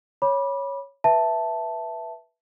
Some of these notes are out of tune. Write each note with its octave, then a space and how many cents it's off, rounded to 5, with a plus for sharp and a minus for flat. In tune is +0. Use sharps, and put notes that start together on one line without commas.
C#5 +0 B5 -20 D6 +5
B4 -15 E5 +0 A5 +0